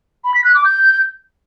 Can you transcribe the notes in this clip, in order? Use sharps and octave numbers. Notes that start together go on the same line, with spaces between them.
B5
B6
F#6
D6
G6